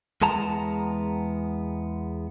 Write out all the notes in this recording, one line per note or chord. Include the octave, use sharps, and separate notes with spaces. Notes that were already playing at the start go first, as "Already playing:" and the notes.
E2 G#3 B3 A5 A#5